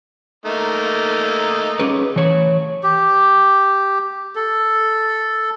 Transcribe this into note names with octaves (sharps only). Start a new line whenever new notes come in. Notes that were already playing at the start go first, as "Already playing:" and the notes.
A3 A#3 D#4
C#4 G#4 B4
E3 C#5
G4
A4